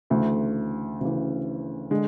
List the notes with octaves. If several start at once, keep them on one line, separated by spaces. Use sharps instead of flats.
D2 C#3 E3 A3
D2 C#3 E3
D3 G#3